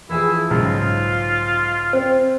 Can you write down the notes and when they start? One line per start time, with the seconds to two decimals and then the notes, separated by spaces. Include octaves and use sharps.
0.10 E3 F3 E4 G#4
0.50 B1 G#2 C#3 F4
1.93 C4 C5